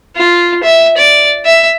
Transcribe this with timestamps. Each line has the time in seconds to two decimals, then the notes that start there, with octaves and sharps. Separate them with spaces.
0.16 F4
0.63 E5
0.97 D5
1.45 E5